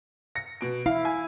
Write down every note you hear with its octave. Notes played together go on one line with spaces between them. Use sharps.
A#6 C#7
B2 D7
E4 F5
G#5